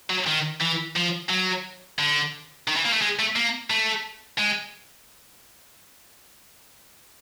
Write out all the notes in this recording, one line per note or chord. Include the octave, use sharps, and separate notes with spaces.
F#3
D#3
E3
F3
F#3
D3
D#3
E3
A#3
A3
G#3
A3
A#3
A3
G#3